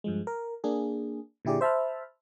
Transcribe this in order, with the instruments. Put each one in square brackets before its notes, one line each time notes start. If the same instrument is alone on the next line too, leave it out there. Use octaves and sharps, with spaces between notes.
[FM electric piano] G2 F3 G#3
A#4
A#3 D4 G#4
A#2 D3 E4 G4 G#4 D5
C5 E5 A5 B5 F6